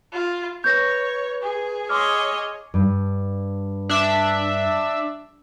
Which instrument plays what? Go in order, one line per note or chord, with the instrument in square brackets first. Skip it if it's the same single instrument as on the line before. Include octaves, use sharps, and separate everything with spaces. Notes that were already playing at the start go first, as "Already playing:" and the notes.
[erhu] F4
[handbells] B4 C#6 [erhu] C#5 [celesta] G6 A#6
[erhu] G#4
[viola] C#5 D#5 [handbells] C6 D6 F6
[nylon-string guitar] G2
[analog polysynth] D4 E5